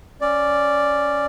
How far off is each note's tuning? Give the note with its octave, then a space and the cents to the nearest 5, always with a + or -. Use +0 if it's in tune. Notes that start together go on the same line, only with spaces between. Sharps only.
C#4 +0 D5 +0